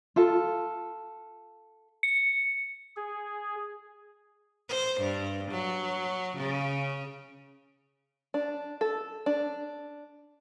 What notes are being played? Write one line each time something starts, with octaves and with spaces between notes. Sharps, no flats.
F4 A4
C#7
G#4
C5
G2
F#3
C#3
D4
A4
D4